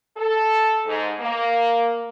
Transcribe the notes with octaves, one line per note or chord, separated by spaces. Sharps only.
A4
G#2
A#3